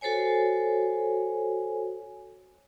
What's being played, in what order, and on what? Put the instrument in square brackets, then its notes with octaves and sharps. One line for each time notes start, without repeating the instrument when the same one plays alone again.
[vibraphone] F#4 A4 C5 C#5 G#5